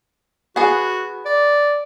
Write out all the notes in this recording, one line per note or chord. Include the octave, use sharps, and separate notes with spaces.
B3 F#4 G#4
D5